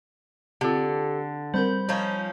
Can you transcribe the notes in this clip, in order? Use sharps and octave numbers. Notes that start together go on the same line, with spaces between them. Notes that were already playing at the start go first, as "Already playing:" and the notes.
D3 C4 F4 G4 A4
G3 C4 A#4 C5 B5 G6
F3 C#4 D#4